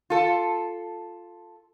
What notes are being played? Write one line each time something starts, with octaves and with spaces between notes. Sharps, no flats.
F4 A4